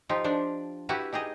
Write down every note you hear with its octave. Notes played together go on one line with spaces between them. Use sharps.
F3 D#4 F4 G4
F3 D4 D5
E4 F#4 G4 B4
D#4 G4 G#4 D#5